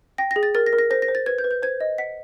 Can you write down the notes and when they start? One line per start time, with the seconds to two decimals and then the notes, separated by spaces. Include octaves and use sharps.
0.18 G5 A#6
0.31 A#6
0.36 G#4
0.43 A6
0.55 A#4 A6
0.66 A#6
0.73 A#4
0.79 A#6
0.90 C5 A#6
1.02 A#6
1.08 C5
1.15 A6
1.26 B4 G#6
1.38 G6
1.44 B4
1.51 G6
1.62 C5 G#6
1.81 D#5
1.98 F#5 B6